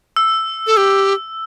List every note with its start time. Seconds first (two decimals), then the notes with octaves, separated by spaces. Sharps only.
0.16 E6
0.67 A4
0.77 G4